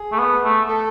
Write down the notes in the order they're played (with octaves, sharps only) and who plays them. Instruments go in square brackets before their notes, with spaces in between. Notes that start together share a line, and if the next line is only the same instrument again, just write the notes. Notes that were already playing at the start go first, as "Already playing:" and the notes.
Already playing: [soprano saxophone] G#4
[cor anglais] A3
B3
A3
[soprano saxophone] A4